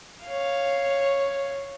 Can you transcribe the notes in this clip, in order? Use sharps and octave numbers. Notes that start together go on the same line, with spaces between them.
C#5 F5